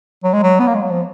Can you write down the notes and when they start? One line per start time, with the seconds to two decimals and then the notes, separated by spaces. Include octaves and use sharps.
0.24 F#3
0.33 G#3
0.43 F#3
0.60 B3
0.67 A#3
0.75 G#3
0.82 F#3
0.90 F3